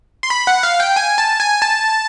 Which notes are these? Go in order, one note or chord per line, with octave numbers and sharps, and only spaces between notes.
C6
B5
F#5
F5
G5
G#5
A5
G#5
A5